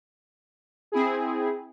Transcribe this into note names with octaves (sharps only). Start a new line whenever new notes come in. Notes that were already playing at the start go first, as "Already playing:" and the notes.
C4 E4 G#4